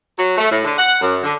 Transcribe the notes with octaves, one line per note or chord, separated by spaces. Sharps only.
F#3
A3
A2
D3
F#5
F#2
D3